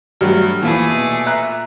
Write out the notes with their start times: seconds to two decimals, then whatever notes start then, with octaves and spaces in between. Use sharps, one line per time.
0.21 G2 F#3 A3
0.62 E2 A#2 F3 A3 E4 G#4
0.91 B2
1.26 E5 A#5 F#6